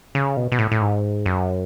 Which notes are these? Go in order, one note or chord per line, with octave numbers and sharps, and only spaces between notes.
C#3
B2
B2
A2
A2
G#2
F#2